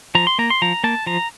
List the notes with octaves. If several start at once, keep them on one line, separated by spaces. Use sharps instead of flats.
F3 A#5
C6
A#3 A#5
C6
F3 A#5
A#3 A5
F3 A#5